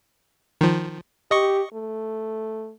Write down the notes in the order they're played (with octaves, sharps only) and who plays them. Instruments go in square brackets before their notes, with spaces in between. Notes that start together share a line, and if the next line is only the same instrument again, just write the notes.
[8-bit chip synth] D#3 F3
[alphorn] G4 [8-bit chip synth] D#5 C#6
[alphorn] A3